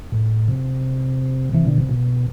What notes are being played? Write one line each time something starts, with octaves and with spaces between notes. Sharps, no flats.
A2
C3
C3 E3
B2 D3
C3
B2